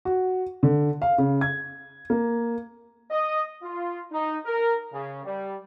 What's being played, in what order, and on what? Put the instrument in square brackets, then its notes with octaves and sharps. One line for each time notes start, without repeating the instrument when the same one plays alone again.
[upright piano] F#4
D3
F5
C#3
G#6
A#3
[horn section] D#5
F4
D#4
A#4
C#3
G3